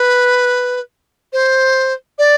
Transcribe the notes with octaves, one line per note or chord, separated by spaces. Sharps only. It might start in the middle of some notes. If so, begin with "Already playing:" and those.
Already playing: B4
C5
D5